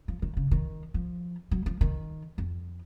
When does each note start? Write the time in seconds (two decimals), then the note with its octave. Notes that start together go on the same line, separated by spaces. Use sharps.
0.08 F3
0.22 D#3
0.37 C#3
0.51 D#3
0.94 F3
1.51 F#3
1.66 F3
1.81 D#3
2.38 F2